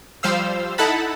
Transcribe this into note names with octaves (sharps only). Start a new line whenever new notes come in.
F3 G3 C5 F5 E6
D#4 E4 A4 F#5 A5 B5